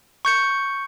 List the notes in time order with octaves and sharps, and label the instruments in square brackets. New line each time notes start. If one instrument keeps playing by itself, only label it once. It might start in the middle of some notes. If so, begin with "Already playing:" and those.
[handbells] C#6 G6 C#7